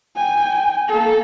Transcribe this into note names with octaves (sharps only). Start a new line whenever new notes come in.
G5 G#5
A#3 A4